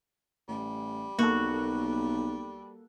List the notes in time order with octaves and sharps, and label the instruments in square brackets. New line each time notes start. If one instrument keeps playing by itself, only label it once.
[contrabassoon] A1 [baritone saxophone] G3
[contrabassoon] B1 [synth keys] A#3 A4 [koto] F#4